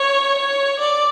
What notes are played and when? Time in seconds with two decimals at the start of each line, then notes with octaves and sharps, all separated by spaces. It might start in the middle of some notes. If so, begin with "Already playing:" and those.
Already playing: C#5
0.38 C#5
0.79 D5